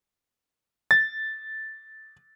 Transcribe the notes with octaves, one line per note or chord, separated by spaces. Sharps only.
A6